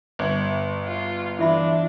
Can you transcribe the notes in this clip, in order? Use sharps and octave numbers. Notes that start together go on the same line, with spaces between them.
G1 G#6
F4
E3 D4 F4 E5 B5